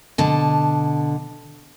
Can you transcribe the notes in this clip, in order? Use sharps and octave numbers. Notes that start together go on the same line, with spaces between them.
B2 D3 A5